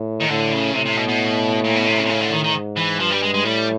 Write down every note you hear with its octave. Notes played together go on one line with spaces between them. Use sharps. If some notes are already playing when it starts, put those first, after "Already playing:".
Already playing: A2
D#3
A2 D3
C#3
A2 C3
C3
B2
B2
A#2
B2
C3
C#3
C3
C#3
D3
D#3
D#3
G#2
E3
G2 F3
G3
G#3
G#3
A2 G3